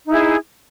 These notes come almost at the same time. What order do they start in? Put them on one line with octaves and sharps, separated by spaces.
D#4 E4 G#4